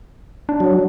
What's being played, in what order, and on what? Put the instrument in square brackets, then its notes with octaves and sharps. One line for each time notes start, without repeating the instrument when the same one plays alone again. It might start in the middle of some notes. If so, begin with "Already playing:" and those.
[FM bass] D4
[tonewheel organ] F#3